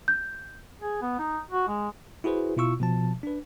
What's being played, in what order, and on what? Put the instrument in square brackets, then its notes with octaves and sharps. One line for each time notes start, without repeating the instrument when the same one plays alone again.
[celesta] G6
[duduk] G#4
B3
D#4
F#4
G#3
[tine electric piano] E4 F#4 G#4 B4 C5
B2 E4 F4 C#6 E6
B2 F3 A5
D4 B4